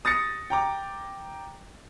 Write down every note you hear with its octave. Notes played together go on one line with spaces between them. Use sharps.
D#6 A6 A#6 C#7
G5 A#5 D6